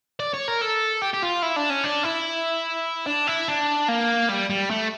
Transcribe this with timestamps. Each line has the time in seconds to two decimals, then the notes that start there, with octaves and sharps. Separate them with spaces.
0.20 D5
0.34 C#5
0.48 A#4
0.61 A4
1.02 G4
1.13 G4
1.22 F4
1.42 E4
1.56 D4
1.70 C#4
1.84 D4
2.04 E4
3.06 D4
3.27 E4
3.48 D4
3.89 A#3
4.29 G3
4.50 G3
4.70 A3